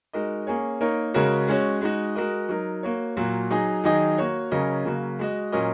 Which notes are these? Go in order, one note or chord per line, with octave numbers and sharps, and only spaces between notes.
G#3 D#4 F#4 A#4 D#5
A#3 C#4 G#4 C#5
A#3 D#4 A#4 C#5
C#3 G#3 F#4 A#4 C#5
G#3 C#4 F#4 C#5
G#3 D#4 F#4
G#3 F#4 A#4 D#5
F#3 D#4 A#4
A#3 F#4 C#5
A#2 F#3 A#3 F#4
F#3 D#4 G#4 D#5
D#3 F#3 D#4 G#4 D#5
A#3 F#4 C#5
C#3 F#3 C#4 A#4 D#5
C#3 F#3 A#3 F#4
G#3 F#4 D#5
A#2 F#3 C#4 A#4 D#5